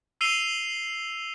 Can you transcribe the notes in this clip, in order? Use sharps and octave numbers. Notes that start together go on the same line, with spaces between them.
E6 C7 D#7 F7 G7